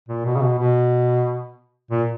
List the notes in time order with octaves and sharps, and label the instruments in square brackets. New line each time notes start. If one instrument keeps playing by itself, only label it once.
[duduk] A#2
B2
C#3
B2
B2
A#2